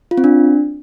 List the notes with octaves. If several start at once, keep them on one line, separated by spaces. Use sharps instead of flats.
F4
C4
D4